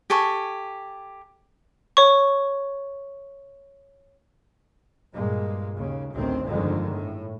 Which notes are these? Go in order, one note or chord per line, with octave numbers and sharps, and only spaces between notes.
G4 A4 G#5 C#6
C#5 C#6
G2 A#2 G#3 A#3
D#2 C#3
A1 D2 D#3 C4
G1 F2 D3 D#3 G#3
A2